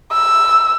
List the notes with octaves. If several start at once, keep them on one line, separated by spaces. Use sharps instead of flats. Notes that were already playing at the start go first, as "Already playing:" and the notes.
E6